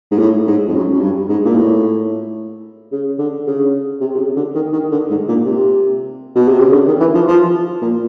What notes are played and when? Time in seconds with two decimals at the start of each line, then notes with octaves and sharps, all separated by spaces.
0.12 G#2
0.19 A2
0.47 G#2
0.67 F2
0.75 F#2
0.93 F#2
1.01 G2
1.29 G#2
1.45 A#2
1.55 A2
2.92 C#3
3.19 D3
3.47 C#3
4.01 C3
4.15 C3
4.19 C#3
4.37 D3
4.55 D#3
4.73 D#3
4.91 D3
5.10 G#2
5.29 A#2
5.46 C3
6.35 B2
6.48 C3
6.60 C#3
6.73 D3
6.87 D#3
7.00 E3
7.15 F3
7.28 F3
7.82 A#2